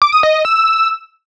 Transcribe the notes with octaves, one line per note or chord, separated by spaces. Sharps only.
D6
D#6
D#5
D#5
E6